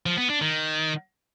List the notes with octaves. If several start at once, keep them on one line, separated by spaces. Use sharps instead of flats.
F3
B3
D4
D#3